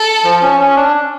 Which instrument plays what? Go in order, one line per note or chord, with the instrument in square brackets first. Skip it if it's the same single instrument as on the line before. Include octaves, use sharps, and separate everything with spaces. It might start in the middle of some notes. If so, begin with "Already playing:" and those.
Already playing: [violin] A4
[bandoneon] F3
C#4
C#4
D4